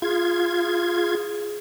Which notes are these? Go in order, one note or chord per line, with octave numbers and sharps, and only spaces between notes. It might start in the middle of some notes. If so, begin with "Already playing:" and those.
F4 G#4 G#6